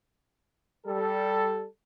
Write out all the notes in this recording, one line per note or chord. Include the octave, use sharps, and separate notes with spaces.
G3 A4